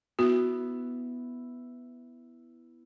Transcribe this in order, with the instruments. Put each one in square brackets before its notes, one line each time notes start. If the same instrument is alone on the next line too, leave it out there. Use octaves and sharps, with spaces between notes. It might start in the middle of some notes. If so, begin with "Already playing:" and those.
[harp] B3 E4 [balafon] F#4